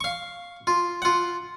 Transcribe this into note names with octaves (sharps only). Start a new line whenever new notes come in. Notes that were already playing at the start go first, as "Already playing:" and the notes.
F5 C#6
F4
F4 F#5